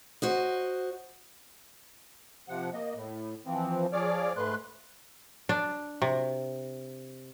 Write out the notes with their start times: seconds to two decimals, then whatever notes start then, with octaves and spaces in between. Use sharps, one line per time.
0.22 F#4 C5 D#5
2.49 C3 F3 F#5
2.74 A#3 D#5
2.95 A2
3.46 E3 F3 C4
3.93 F3 G#4 C#5 D5 D6 F6
4.37 G#2 A3 B4 C6 F#6
5.49 D4
6.02 C3